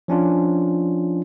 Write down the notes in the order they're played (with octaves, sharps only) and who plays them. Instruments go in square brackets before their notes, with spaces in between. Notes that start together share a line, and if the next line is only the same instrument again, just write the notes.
[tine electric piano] F3 C#4 D4 F4